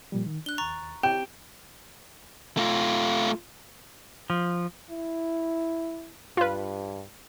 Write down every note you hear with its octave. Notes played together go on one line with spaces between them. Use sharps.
A#2 F3 G3
D#3
D4 F#6 G7
D#2 A#5 C#6 A6
C4 G4 G5
A3 F4
F3
E4
G2 F4 B4